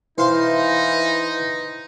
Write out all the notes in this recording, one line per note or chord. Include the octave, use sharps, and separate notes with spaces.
E3 D#4 E4 C5 F5 C6